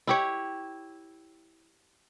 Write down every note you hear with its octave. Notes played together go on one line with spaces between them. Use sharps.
E4 G4 C#5